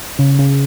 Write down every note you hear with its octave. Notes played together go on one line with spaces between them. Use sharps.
C#3
C#3